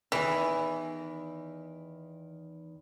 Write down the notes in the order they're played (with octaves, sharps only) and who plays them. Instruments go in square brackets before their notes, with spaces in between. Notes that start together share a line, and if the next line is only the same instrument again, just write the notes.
[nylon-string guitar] E2 D#3 G#4 [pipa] E3